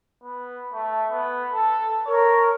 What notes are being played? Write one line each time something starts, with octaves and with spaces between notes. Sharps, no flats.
B3
A3
B3
A4
A#4 C#5